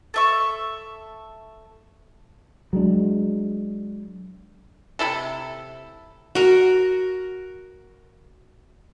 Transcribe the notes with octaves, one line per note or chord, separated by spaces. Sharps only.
A4 E5 C#6
F#3 G#3 D4
C3 G#3 E4 A4
F#4 A#4